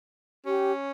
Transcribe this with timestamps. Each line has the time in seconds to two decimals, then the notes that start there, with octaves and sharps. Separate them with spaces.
0.46 C#4 G4